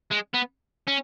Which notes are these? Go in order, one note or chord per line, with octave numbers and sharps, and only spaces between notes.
G#3
B3
C#4